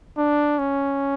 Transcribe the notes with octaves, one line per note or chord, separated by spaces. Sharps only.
D4
C#4